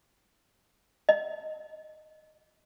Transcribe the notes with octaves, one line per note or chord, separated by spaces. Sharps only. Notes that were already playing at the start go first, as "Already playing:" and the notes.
D#5